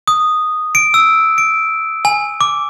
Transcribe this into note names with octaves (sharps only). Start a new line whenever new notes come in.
D#6
D7
E6
D7
G#5
D6